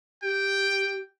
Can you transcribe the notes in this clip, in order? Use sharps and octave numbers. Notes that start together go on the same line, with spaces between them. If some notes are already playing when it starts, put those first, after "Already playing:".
G4 G5